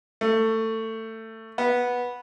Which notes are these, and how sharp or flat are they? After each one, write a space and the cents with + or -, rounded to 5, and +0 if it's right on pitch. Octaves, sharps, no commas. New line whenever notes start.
A3 +20
B3 -10